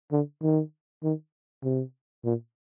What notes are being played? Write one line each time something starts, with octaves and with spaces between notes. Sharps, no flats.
D3
D#3
D#3
C3
A#2